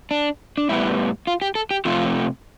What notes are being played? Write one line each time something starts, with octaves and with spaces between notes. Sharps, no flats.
D4
D4
A2 G3 B3 E4
F4
G4
A4
G4
C3 F3 A3 F4